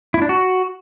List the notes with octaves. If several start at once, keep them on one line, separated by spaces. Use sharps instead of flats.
E4
D4
F#4